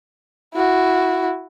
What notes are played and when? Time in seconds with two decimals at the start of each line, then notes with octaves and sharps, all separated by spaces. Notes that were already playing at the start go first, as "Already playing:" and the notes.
0.54 E4 F#4